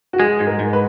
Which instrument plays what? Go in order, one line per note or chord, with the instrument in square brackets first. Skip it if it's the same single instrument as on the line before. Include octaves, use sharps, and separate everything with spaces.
[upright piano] F#4
[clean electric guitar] G#3 [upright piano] G#4
[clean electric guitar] G#2
[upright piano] A#4
[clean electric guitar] G#2
[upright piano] B4